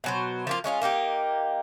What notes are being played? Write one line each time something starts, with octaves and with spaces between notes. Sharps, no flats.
B2 F#3 C5
F3 A#3 F4
G#3 C#4 E4 F4
A#3 D4 D#4 G4